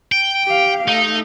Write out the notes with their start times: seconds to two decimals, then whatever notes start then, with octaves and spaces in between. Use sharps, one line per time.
0.12 G5
0.45 G4 F5
0.88 A3 D#4